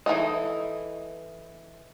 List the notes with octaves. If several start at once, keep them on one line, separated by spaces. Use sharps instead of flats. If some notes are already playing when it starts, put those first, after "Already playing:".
E3 C4 D#4 A4 D#5